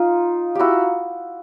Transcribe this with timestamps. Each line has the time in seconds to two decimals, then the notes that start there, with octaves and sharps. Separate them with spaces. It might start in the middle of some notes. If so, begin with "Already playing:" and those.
Already playing: D#4 F4
0.55 E4 F#4 G4